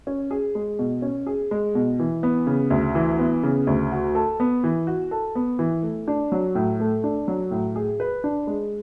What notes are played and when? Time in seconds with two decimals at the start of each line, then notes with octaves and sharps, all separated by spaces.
0.07 C#4
0.31 G#4
0.55 G#3
0.79 B2
1.02 C#4
1.27 G#4
1.51 G#3
1.75 B2
1.99 E3
2.23 B3
2.47 C#3
2.70 D2
2.95 E3
3.19 B3
3.43 C#3
3.67 D2
3.92 F#4
4.15 A4
4.40 B3
4.64 E3
4.87 F#4
5.11 A4
5.35 B3
5.59 E3
5.83 A3
6.08 D4
6.32 F#3
6.55 A2
6.80 A3
7.04 D4
7.28 F#3
7.51 A2
7.76 G#4
8.00 B4
8.24 D4
8.47 G#3